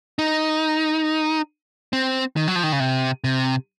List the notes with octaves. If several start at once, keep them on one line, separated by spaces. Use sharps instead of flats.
D#4
C4
D#3
F#3
F3
D#3
C#3
C3
C3